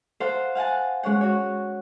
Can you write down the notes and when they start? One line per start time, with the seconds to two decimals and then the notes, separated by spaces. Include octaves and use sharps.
0.20 A4 C5 F5 F#5
0.55 F5 F#5 G#5 A5
1.03 G#3 C#4 C#5 F#5
1.21 F#4 C#5